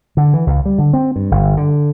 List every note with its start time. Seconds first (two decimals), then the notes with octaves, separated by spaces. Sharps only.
0.17 D3
0.34 E3
0.47 C#2
0.65 G3
0.78 D3
0.93 C4
1.16 G2
1.31 G1
1.57 D3